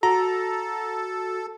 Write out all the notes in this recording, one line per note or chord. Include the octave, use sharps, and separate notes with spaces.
F#4 A4 A#5